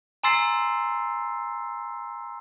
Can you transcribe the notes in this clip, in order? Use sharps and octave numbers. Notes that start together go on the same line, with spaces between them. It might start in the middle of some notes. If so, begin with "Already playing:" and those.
G#5 A#5 C6 E6 A6 C7